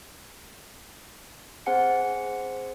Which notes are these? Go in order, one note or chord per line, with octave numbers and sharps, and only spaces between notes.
C4 G#4 C5 F#5 G#5 C#7